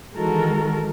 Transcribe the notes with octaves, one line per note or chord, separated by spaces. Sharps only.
D#3 E3 G#3 F#4 A4 A#4